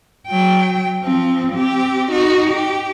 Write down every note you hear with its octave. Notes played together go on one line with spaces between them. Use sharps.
F#3 G5
F3 C4
C4 G4
D#4 F#4
G4